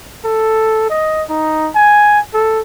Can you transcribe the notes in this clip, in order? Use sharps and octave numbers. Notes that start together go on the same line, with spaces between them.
A4
D#5
D#4
G#5
A4